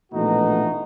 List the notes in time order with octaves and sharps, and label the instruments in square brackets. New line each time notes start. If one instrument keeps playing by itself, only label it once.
[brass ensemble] A#1 B2 E3 A3 D#4 F#4